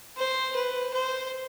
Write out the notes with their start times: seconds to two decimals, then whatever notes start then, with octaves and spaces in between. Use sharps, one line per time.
0.17 C5
0.55 B4
0.93 C5